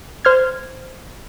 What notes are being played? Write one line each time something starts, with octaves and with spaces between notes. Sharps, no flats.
C5 F6 G#6